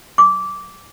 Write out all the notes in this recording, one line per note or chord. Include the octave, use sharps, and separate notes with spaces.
D6